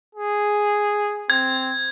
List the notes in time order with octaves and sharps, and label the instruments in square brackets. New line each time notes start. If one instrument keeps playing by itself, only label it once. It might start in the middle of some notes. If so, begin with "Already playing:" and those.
[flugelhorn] G#4
[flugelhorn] C4 [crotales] G#6